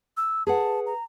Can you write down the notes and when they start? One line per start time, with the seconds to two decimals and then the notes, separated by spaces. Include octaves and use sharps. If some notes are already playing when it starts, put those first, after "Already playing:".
0.17 E6
0.47 G#4 B4 F#5 A5
0.86 A#5